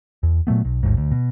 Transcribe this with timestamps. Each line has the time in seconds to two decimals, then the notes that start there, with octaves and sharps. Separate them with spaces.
0.23 E2
0.47 A#2 F#3 A3 B3
0.65 B1
0.83 A1 D#2 G#2
0.97 D2
1.11 B2